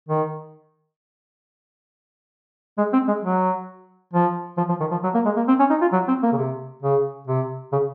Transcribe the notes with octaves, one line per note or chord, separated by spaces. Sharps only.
D#3
G#3
C4
G#3
F#3
F3
F3
F3
D#3
F3
F#3
A#3
G#3
A#3
C4
C#4
D#4
F4
F#3
C4
A#3
C#3
C3
C#3
C3
C#3